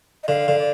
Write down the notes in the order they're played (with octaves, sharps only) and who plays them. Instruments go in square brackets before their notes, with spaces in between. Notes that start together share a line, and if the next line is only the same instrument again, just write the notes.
[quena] D#5
[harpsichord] D3 [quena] F5
[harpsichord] D3
[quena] D5